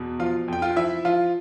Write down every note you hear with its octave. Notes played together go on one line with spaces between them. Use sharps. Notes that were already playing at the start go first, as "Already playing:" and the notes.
Already playing: E2 B2
F3 F4 F5
F2 G5
F4 F5
F3 E4 E5
F3 F4 F5